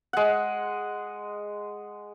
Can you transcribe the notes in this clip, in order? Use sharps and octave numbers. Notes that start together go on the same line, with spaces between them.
G#3 F#5